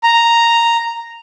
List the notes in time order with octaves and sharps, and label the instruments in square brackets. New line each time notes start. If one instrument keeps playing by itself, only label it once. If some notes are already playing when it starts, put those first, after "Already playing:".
[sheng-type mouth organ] A#5